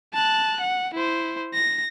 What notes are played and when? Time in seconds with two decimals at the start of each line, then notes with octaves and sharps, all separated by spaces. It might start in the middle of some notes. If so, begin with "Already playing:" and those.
0.14 A5 F#6
0.61 F#5
0.94 E4 C5
1.54 A#6